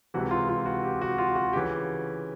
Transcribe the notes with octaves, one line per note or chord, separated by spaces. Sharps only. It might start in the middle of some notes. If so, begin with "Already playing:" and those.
C#2 C3 E3 F#4
F4
F4
F#4
G4
F#4
F4
F#4
G4
C#3 E3